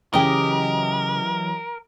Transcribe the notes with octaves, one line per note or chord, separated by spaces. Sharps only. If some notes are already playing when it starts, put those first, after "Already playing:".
C#3 E3 F#3 G4 A#4 D#5 G5